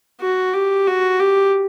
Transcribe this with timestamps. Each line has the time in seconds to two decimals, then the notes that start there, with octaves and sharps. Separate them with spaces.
0.20 F#4
0.53 G4
0.87 F#4
1.20 G4